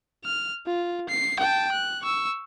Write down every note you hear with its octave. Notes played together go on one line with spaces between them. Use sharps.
F6
F4
C7
G5 A5
F#6
C#6 E6